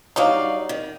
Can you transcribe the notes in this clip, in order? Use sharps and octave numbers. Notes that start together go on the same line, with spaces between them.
G2 F#3 D#4 D5 F5
D#3